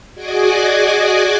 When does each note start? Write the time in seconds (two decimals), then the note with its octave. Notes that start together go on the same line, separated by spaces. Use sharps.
0.15 F#4 G#4 D5 D#5 G#5 D6